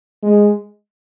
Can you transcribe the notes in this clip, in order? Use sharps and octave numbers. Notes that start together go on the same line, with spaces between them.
G#3